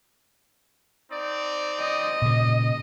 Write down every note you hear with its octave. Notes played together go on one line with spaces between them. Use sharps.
C4 D#4 D5
D#5
A#2 C#3